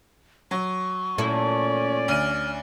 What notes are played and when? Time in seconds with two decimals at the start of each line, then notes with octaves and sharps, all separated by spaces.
0.51 F#3 C#6
1.18 A#2 A3 C#4 E4 D5
2.08 D2 F6 D#7